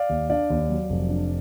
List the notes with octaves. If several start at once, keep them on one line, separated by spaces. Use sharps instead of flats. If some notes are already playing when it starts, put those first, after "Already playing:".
Already playing: D5 F5
D#2
D4 D5 F5
D#2
F#3
F1
D4